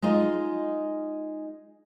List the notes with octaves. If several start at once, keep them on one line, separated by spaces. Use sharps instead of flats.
G#3 D#4 F4 D#5